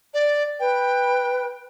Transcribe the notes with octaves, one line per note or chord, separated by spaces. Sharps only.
D5
B4 G5